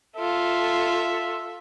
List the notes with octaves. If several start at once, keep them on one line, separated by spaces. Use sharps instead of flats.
F4 A4 E5